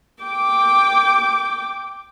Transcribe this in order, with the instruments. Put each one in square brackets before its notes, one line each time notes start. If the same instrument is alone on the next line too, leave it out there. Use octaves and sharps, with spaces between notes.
[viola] G5 D6